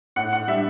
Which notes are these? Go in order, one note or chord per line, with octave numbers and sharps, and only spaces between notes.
A2 F#5
F#5
G3 D4 E5